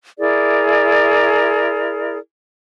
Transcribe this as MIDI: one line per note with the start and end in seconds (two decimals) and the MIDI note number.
0.18 2.17 64
0.18 2.17 68
0.18 2.17 70
0.18 2.17 74